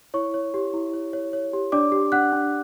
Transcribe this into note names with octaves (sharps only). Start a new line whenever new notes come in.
E4 C#5 C#6
C#5
G4
E4
C#5
C#5
C#5
G4
D4 D5 D6
G4
D4 F#5 F#6
D4